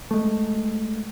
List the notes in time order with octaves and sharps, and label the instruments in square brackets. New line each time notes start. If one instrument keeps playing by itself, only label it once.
[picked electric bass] G#3 A3